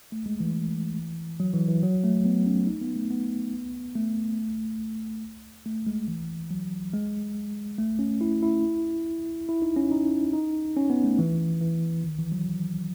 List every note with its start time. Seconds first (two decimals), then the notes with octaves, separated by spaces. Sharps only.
0.12 A3
0.26 G#3
0.40 E3
1.40 F#3
1.54 E3
1.68 E3
1.83 F#3
2.04 A3
2.25 B3
2.46 C#4
2.67 D#4
2.82 B3
2.96 A3
3.11 B3
3.96 A3
5.66 A3
5.87 G#3
6.08 E3
6.51 F#3
6.93 G#3
7.78 A3
7.99 C#4
8.21 E4
8.43 E4
9.49 E4
9.62 D#4
9.76 C#4
9.91 D#4
10.33 D#4
10.77 C#4
10.90 B3
11.04 A3
11.19 E3
11.61 E3
12.04 D#3
12.18 E3
12.32 F#3